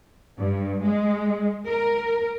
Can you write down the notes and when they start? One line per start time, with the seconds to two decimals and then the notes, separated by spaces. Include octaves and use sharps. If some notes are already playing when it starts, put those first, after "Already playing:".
0.38 G2
0.85 G#3
1.67 A#4